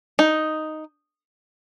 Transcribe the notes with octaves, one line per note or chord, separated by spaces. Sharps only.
D#4